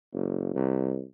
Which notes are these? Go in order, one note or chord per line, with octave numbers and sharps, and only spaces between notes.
F#1
C2